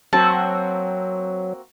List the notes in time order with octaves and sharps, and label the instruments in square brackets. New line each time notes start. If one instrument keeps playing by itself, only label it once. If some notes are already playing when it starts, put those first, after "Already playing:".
[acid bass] F#3 [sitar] A#3 C4 F#4 [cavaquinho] A5